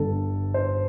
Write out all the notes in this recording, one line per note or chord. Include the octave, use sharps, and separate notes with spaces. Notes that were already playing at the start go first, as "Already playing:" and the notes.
Already playing: G1 G2 D3 A4
C5